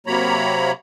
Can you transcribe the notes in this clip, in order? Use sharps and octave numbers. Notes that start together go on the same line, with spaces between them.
C3 F#3 A#3 C#5 A#5 B5